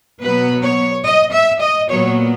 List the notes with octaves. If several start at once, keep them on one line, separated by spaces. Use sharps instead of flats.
B2 F#3 B3 B4
C#5
D#5
E5
D#5
A#2 F#3 B3 C#5